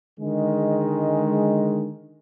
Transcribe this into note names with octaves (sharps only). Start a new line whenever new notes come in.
D3 D#3 G#3